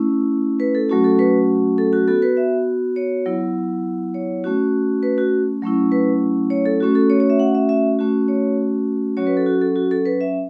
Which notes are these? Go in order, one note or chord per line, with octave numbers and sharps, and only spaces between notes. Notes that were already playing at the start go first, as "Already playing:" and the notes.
Already playing: A3 C#4 E4
B4
A4
F#3 A3 C#4 F#4
A4
B4
A4
F#4
B3 F#4 A4
B4
E5
C#5
F#3 B3 E4
C#5
A3 C#4 F#4
B4
F#4
F#3 A3 C#4 E4
B4
C#5
A4
A3 C#4 F#4
A4
C#5
C#5
E5
F#5
E5
E5
A3 C#4 F#4
C#5
F#3 C#4 F#4 C#5
B4
A4
F#4
A4
F#4
A4
B4
E5